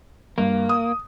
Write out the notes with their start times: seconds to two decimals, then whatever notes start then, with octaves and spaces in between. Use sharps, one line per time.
0.38 G2 A#3
0.69 D#6